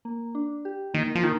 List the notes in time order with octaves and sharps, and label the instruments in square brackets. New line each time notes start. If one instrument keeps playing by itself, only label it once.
[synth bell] A#3
D4
G4
[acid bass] D#3 [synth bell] A#3
[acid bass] F3
[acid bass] D#3 [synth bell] A#3